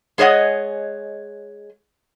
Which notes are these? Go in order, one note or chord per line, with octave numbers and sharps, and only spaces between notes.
G#3 G#4 C#5 D#5 F#5